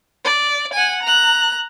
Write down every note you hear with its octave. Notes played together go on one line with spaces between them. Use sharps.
D5
F#5 G#5
A#5 F#6